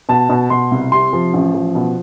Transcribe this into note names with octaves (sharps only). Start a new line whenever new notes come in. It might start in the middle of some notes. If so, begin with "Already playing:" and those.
B2 A5
B2
B2 C6
C2
C3 C6
F3
A1
F3
B2